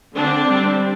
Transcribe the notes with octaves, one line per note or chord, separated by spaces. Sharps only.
D3 C4 D4
G3 C4